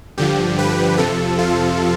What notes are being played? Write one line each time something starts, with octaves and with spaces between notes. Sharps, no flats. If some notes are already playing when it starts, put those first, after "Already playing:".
G2 D3 F3 G4
B4
F2 C3 F3 A4
F4